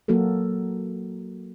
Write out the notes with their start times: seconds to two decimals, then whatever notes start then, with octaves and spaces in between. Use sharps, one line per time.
0.08 F#3 A#3 F#4 A4 A#4